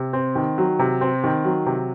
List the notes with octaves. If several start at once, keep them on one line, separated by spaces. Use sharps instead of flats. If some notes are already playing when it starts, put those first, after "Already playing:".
Already playing: C3
C4
D#3
F#3
C3
C4
D#3
F#3
C3